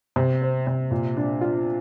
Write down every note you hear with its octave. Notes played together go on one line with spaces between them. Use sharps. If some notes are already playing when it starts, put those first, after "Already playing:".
C3
C4
C3
A#2
D4
F4